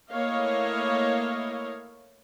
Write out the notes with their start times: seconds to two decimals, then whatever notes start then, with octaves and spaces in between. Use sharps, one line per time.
0.12 A3 A#3 E4 C#5 D#5 F5